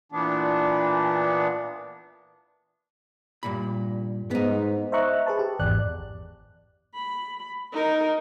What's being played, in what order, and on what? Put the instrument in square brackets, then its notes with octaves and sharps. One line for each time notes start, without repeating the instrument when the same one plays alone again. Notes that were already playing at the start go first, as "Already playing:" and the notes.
[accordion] A#2 E3 B3 D4
[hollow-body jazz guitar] G2 A#2 B5
[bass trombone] G#2 [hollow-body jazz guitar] B3 D#4
[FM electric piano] C5 D#5 E5 A#5 C#6 F#6
G#4 B4 A5
G4
G#1 E2 D5 F#6
[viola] B5
D#4 A#4